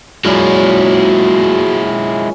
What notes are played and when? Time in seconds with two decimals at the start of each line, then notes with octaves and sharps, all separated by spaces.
0.25 F#2 A#2 C#3 F#3 G#3 E4